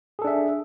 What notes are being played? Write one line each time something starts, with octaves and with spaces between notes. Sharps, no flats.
D4 G#4 A4 E5